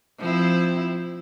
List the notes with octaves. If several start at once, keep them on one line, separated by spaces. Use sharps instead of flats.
F3 C4 E4